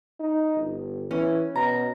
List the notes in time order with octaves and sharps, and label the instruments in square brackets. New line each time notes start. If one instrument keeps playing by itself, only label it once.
[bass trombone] D#4
G1
[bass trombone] E3 [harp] C#4
[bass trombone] B2 [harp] A#5